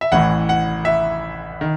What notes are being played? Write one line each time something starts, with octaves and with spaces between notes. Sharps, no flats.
E5
A1 A2 E3 F#5
F#5
E5
D#3